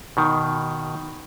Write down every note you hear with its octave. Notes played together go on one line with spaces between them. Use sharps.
B2 D#3